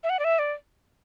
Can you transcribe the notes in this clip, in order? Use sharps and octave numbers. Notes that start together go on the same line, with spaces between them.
E5
F#5
D5
E5
D5